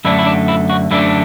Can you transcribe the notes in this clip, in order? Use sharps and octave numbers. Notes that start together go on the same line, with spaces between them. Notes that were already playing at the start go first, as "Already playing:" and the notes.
F#2 D3 A3 D4 E4
E4
D4
E4
F#4
F#2 D3 A3 D4 E4